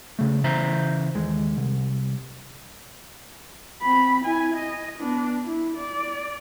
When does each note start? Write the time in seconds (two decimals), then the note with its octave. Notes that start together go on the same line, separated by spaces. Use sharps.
0.19 C#3 A3
0.44 C#3 E3 C5 E5 A#5
1.15 D#2 G#3
1.57 C2
3.82 C4 B5
4.25 E4 G#5
4.56 D#5
4.99 B3 D4
5.45 E4
5.76 D5